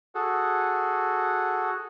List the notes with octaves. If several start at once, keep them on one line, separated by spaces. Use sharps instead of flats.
F#4 G#4 A4